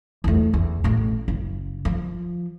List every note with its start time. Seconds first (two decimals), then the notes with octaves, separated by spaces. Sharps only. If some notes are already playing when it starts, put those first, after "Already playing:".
0.24 E2 A3
0.53 E2
0.84 A1 A2
1.28 F#1
1.85 F3